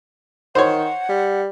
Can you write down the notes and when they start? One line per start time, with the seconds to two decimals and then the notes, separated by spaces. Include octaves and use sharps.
0.55 D#3 C5 C#5 F#5
1.09 G3